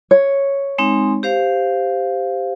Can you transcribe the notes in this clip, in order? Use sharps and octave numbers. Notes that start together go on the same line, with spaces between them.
C#5
G#3 C4 D#4
G4 C5 F5